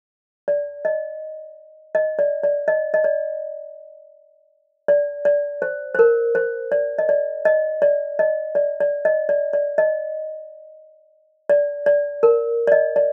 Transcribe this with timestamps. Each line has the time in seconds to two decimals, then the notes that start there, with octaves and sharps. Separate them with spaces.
0.48 D5
0.85 D#5
1.95 D#5
2.19 D5
2.43 D5
2.68 D#5
2.94 D#5
3.04 D5
4.88 D5
5.25 D5
5.62 C5
5.95 C5
5.99 A#4
6.35 C5
6.72 D5
6.98 D#5
7.09 D5
7.45 D#5
7.82 D5
8.19 D#5
8.55 D5
8.80 D5
9.05 D#5
9.29 D5
9.53 D5
9.78 D#5
11.49 D5
11.86 D5
12.23 A#4
12.67 D5
12.72 D#5
12.96 D5